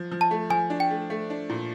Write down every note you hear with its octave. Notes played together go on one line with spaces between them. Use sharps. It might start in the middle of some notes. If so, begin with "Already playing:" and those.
Already playing: F3
F3
A5
A3
F3 G#5
D4
G5
A3
A3
D4
A#2